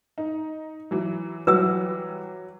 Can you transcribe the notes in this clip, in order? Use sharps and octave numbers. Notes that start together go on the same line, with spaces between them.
D#4
E3 F#3
E3 F#3 G3 B4 F#5 E6